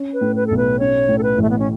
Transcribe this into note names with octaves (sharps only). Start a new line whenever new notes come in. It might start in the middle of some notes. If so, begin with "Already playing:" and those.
Already playing: C#4
B4
A2
B4
B1 A4
B4
C#4 C#5
A2
A4
B4
A1 A3
B3
C#4